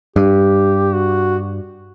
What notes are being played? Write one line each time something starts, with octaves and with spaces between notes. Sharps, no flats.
G2 G4
F#4